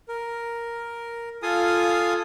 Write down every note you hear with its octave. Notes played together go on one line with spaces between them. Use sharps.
A#4
F4 A4 F5 G#5 D#6